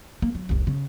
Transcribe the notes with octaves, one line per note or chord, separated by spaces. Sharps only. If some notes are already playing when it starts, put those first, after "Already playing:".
A#3
F#3
F1 C2
C#3